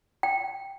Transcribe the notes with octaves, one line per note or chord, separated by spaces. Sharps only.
G5